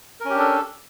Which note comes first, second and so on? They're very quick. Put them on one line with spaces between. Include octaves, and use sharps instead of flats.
A#4 C#4 G4 D4 A4